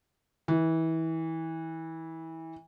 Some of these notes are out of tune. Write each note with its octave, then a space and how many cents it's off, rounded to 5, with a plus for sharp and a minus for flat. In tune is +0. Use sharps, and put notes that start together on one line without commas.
E3 -25